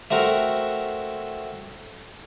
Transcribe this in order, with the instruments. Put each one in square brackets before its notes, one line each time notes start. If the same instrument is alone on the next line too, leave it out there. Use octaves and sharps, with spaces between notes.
[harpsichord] A3 C4 F#4 A#4